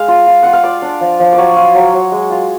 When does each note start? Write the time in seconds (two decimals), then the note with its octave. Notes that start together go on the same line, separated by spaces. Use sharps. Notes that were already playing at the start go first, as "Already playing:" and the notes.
Already playing: G#3 F5
0.08 F4
0.27 F4
0.43 F4 F#5
0.53 F5
0.63 F4 D5
0.82 D4
1.01 F3
1.20 F3
1.33 D5
1.38 F#3 C#5
1.56 F4
1.75 F#3
1.93 F#3
2.12 G#3
2.30 F4